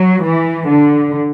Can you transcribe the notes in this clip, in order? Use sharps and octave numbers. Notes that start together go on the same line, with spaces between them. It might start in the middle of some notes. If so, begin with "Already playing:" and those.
Already playing: F#3
E3
D3